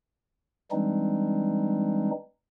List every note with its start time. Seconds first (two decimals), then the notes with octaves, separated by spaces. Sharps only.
0.71 E3 G3 G#3 C4 D4 D#4